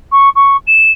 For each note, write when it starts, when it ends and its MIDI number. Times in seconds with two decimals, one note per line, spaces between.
0.12 0.29 85
0.35 0.57 85
0.67 0.91 100